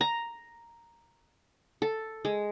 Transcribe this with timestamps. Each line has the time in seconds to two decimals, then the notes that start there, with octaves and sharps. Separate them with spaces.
0.01 A#5
1.82 A4
2.25 G#3